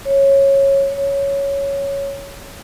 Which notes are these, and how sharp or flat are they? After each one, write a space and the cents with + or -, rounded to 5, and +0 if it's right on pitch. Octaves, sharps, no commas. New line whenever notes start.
C#5 -15
C#5 +5